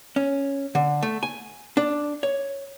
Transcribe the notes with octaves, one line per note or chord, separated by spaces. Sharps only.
C#4
D3
A3
G#5
D4
C#5